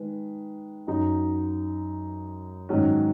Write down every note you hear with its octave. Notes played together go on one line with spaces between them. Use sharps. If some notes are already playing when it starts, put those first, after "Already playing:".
Already playing: D#3 G#3 B4
F#2 F#3 D#4
G#2 D#3 F#3 C#4